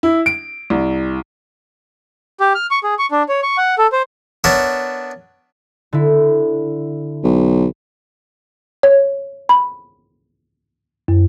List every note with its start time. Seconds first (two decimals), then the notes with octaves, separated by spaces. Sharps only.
0.03 E4
0.26 D7
0.70 C2
2.40 G4
2.55 F6
2.71 C#6
2.83 G#4
2.99 C#6
3.11 D4
3.29 C#5
3.43 C#6
3.58 F#5
3.78 A4
3.92 C5
4.44 B3 D4 A#4 C#5 E5
5.93 D3 E4
7.24 B1
8.83 C#5
9.49 B5
11.08 F#2